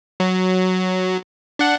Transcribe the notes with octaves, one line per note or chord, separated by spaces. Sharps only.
F#3
D4 F#5